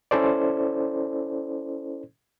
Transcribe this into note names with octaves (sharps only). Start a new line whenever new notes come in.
C#4 E4 A4 C5 D5